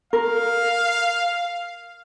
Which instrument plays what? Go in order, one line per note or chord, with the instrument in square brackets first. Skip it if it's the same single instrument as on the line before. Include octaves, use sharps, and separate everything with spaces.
[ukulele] A#4 [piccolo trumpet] F5